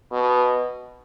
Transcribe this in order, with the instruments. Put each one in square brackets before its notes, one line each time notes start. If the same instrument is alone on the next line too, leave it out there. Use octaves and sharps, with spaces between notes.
[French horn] B2